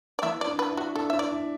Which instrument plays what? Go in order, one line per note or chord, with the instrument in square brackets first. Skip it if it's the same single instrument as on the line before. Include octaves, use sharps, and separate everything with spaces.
[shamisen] D5
[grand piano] E3 [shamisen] E5
[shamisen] D5
[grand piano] D4
[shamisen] B4
[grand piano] E4
[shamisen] F#4
[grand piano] D4 [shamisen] A4
[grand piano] D4 [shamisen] E5
[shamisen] D5
[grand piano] E4